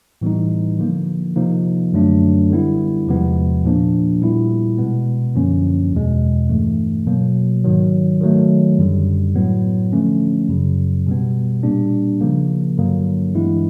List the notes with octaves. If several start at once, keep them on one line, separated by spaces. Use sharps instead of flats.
A2 E3 G3 B3 D#4
D3 F3 A#3
C3 F3 A#3 D#4
F#2 D3 F#3 A3 D4
D3 G3 B3 E4
E2 C3 F3 G#3 B3
A#2 F3 A#3 D4
A#2 G3 B3 E4
B2 G#3 B3
F#2 D3 F3 A#3 C#4
E2 B2 G#3
G2 E3 A3
B2 F#3 A#3
G#2 D#3 F#3
D#3 F#3 A3
F#2 D3 G3
A2 F#3 B3
D3 F3 A3 C#4
F#2 C#3 F#3
B2 G3 B3
A#2 G3 A#3 D4
C#3 F3 A#3
G2 D3 F#3 A#3
G2 E3 G#3 B3 E4